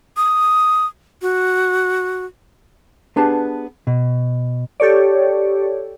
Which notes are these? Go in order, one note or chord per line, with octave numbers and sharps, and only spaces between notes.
D#6
F#4
B3 D4 G4 G#4 B4 A5
B2
G4 A4 C#5 D5